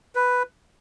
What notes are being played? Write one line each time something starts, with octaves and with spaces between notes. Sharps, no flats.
B4